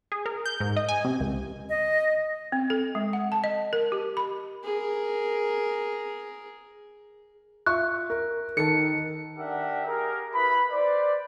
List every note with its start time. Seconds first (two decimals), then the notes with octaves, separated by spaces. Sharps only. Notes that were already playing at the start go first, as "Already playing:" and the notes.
0.12 G#4
0.26 A#4
0.46 G6
0.61 G#2
0.76 D#5
0.89 G#5
1.05 C3
1.20 C#2
1.70 D#5
2.52 C4
2.70 A4
2.95 G#3
3.13 F#5
3.32 A5
3.44 D#5
3.73 A#4
3.92 G4
4.17 B5
4.64 G#4 A#4
7.66 F4 E5 C#6 F#6
8.10 A#4
8.57 D#3 A4 A5 C#7
9.37 D4 G4 A#4 E5 F#5
9.86 G4 G#4 A#4
10.33 E4 B4 B5
10.71 B4 C5 D5